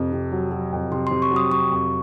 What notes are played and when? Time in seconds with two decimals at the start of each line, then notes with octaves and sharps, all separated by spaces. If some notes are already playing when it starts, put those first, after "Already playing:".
Already playing: F2 C3
0.12 C3
0.32 F#3
0.51 F#3
0.72 F2
0.91 C3 C6
1.07 C6
1.11 C3
1.22 C#6
1.31 F#3
1.36 D#6
1.51 F#3 C#6
1.72 F2